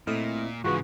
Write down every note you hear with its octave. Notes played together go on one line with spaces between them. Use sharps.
A#2 A3 C4 E4 D#5 E5 F6
G#2 C#3 E3 F4 F#4 G#4 B4